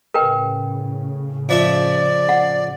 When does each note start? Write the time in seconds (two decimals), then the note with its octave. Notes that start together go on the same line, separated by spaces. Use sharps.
0.14 A2 C#3 A#4 B4 G5
1.49 F2 F3 D5 E5
2.29 F#5